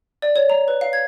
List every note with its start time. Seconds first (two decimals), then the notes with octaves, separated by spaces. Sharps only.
0.22 D5
0.36 C#5
0.50 A#5
0.68 B4
0.81 F5
0.93 G#6